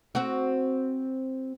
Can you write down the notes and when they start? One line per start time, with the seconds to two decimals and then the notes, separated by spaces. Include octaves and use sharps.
0.15 C4 F#4